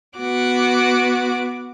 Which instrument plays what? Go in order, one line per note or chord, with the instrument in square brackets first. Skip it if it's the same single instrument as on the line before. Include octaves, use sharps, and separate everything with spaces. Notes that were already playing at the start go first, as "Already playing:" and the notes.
[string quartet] B3 F#4 D6